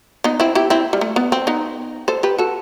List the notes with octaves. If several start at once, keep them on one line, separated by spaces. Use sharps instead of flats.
B3 D#4
C4 E4
E4 G4
C4 E4
G3
A3
B3
C4
B3 D#4
A4 C5
G4 B4
F#4 A4